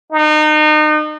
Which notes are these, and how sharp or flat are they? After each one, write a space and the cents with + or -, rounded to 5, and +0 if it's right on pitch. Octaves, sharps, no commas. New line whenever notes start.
D#4 -30